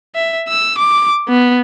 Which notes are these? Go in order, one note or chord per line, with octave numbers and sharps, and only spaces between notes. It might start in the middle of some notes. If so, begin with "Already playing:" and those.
E5
E6
D6
B3